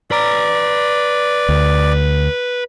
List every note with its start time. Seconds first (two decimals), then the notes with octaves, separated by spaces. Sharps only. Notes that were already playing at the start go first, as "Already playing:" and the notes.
0.11 B4 D5 A#5
1.49 D2